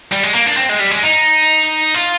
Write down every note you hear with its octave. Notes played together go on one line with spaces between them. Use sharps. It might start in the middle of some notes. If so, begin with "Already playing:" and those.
G3
G#3
A#3
D4
C4
G#3
G3
G#3
D#4
F4